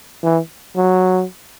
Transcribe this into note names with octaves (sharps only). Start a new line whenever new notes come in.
E3
F#3